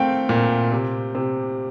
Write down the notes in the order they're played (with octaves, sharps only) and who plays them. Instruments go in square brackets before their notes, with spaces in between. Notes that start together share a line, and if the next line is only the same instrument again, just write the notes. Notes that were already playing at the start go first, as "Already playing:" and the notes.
Already playing: [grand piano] A3 C4 F5 G5
A#2
C3
C3